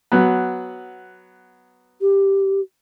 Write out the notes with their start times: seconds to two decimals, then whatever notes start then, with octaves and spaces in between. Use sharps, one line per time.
0.12 F#3 B3
2.01 G4